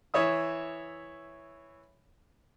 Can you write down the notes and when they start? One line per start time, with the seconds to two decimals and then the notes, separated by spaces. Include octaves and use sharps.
0.14 E3 C#5 E5 D#6